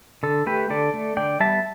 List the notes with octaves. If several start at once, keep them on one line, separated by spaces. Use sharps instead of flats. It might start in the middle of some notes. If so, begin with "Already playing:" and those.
D3 A4
A3 G4 B4
D3 A4 D5
A3
D3 D5 G5
G3 B3 E5 A5